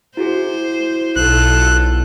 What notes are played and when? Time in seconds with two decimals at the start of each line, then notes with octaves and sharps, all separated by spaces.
0.17 E4 F#4 G#4 C5
1.16 B1 F4 A4 F#6